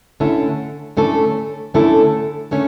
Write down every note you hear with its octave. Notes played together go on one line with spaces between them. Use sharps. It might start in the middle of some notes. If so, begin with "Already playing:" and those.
D3 A3 C#4 E4 A4
D3 A3 C#4 E4 A4
D3 A3 C#4 E4 A4
D3 A3 C#4